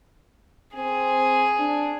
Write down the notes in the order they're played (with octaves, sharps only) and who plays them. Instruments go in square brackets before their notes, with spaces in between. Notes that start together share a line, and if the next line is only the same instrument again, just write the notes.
[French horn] C4 [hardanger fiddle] G#4
[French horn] D4